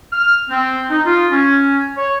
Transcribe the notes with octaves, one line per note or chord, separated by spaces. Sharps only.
F6
C4
D#4
F4
C#4
C#5